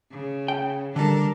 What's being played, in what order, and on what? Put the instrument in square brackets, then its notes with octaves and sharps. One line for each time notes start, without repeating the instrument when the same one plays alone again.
[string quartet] C#3
[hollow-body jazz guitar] G5
[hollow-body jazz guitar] D3 G3 [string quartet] D4 A4 A#4